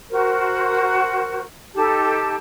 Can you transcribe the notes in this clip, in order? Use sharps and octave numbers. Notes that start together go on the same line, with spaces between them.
F#4 A#4 C5
D#4 G4 A4 A5